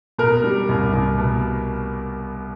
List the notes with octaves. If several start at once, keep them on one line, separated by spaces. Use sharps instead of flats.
B2 A#4
G3
C2
C2
B2